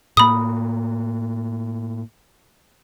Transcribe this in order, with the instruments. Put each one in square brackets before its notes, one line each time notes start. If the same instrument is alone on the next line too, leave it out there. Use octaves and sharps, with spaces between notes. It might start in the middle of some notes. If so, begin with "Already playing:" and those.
[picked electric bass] A2 A#3 [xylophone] B5 D#6